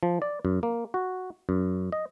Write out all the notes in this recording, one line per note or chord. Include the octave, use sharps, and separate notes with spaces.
F3
D5
F#2
A#3
F#4
F#2
D#5